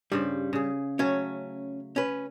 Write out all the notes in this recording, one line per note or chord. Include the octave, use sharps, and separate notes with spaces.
G2 C#3 G3 C5
C#3 G#4
F#3 A3 C#4 C#5
C#4 B4